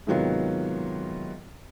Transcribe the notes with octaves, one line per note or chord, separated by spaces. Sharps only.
G#2 C3 D#3 F#3 B3 F4